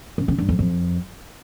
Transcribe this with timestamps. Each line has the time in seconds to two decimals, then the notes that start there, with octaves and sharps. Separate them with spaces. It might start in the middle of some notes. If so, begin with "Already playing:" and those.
0.18 C#3
0.28 C#3
0.38 G2
0.49 F2
0.59 F2